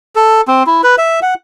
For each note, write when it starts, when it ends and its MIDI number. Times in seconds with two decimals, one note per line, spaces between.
0.15 0.41 69
0.48 0.63 60
0.66 0.81 64
0.83 0.96 71
0.98 1.20 76
1.22 1.34 78